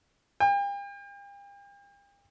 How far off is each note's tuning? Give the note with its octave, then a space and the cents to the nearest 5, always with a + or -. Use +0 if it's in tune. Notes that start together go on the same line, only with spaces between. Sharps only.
G5 +40